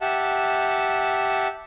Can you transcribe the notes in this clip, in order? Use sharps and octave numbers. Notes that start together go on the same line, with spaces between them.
G4 E5 F#5 A5